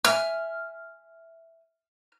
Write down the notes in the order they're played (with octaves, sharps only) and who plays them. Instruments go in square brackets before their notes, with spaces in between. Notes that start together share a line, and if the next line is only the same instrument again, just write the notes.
[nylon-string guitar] E5 G#5 [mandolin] F6